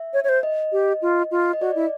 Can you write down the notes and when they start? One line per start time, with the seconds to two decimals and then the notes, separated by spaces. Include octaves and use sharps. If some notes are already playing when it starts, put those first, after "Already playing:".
Already playing: E5
0.14 C#5
0.24 C#5
0.29 C5
0.43 D#5
0.72 G4
1.02 F4
1.31 F4
1.53 D#5
1.61 F#4 D5
1.75 E4